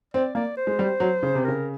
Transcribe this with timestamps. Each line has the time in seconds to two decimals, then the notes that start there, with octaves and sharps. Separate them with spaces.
0.14 C4 D5
0.35 A#3 D5
0.57 C5
0.67 G#3
0.79 G3
1.00 F#3
1.23 C#3
1.35 C3
1.45 C#3 A#4